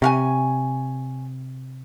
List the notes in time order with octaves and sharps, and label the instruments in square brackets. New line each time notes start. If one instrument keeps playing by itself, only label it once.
[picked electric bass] C3 [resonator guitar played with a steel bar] C#4 F5 G#5